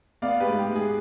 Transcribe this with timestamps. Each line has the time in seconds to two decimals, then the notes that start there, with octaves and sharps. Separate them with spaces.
0.22 B3 D5 F5
0.40 G4 B4
0.47 G#2
0.59 G4
0.70 G#2
0.76 G#4